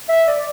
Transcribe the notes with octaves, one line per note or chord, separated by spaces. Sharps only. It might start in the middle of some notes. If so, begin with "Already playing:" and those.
E5
D5